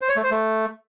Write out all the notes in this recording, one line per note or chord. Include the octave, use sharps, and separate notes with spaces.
C5
C#5
A3
C5
A3